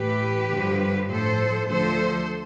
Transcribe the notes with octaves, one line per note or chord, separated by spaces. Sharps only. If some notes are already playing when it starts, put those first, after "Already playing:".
Already playing: A2 E3 G4 B4
G2 D3 F3
A2 F3 A4 C5
D2 D3 F3 A4 C5